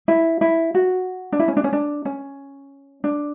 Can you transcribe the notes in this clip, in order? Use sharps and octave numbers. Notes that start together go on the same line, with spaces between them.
E4
E4
F#4
D4
E4
C#4
D4
C#4
D4
C#4
D4